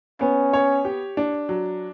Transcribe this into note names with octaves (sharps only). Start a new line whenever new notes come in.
B3 C#4
C#5
G4
D4
F#3